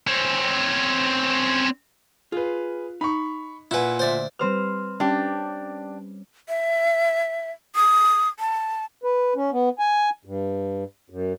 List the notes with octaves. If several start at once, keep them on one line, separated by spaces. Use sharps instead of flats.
C4 C#4
F4 G#4 B4
D#4 B5 C#6
A#2 E4 B4 F#5 G#5
D2 C5 D5 E5
G3 C4 B4 C5 F6
G3 C#4 D4 G4
E5
D#6
A5
B4
C#4
B3
G#5
G2
F#2